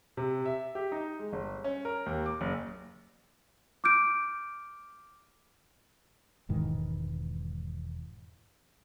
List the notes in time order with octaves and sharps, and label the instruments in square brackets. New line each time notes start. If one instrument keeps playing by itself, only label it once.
[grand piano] C3
E5
G4
D#4
G#3
G1
C#4
A#4
D#2
D6
F#1
[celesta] D6 F6 G6 D7
[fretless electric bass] E1 G#2 D#3 E3